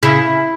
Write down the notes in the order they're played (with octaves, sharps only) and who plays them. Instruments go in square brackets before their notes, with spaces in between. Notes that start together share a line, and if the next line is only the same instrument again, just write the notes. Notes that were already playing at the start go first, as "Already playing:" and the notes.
[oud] C#3 [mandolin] E4